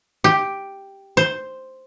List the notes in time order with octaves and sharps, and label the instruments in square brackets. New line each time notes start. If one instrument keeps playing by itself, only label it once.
[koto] G4
C5